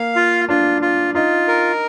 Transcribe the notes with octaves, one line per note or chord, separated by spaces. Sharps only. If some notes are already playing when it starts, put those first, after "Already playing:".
Already playing: A#3 F5
F4
D4 F4
F4
D#4 F4
A#4